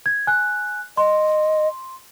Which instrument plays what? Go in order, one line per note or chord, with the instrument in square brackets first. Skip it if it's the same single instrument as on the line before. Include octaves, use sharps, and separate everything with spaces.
[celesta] G#6
G#5 F#6
[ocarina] D#5 [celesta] C6